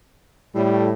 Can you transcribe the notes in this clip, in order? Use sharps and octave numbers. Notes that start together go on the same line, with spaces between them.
A2 G3